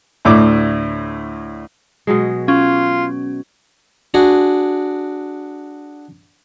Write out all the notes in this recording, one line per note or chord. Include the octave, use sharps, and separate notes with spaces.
D2 A2 D6
B2 F#3 G#3
C#4 F4
D4 F#4 G#4